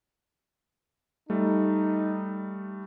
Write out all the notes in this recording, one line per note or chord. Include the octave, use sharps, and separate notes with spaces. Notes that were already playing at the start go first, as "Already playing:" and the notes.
G3 A3 D#4